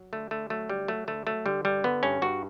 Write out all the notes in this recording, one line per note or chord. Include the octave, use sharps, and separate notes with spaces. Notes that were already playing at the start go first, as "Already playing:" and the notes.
Already playing: F#3
D3 A3
D3 A3
F#3 A3
D2 G3
F#3 A3
D2 A3
F#3 A3
D3 G3
G2 G3
D3 B3
G2 C#4
G2 F#4